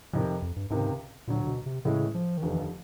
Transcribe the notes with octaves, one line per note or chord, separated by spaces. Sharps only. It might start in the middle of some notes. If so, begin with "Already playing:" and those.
F2 A2 C3 D#3
F2
G2
C#2 G#2 C3 D#3
D2 A#2 D3 F#3
B2
C3
A2 C#3 E3 G#3 C#4
F3
D#3
F1 D#2 D3 E3 F3 A3